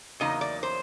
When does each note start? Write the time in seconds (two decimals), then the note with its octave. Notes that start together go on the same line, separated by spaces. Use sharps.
0.20 E2 C#3 F#3 A#3 D#4 D#5
0.41 D5
0.63 C5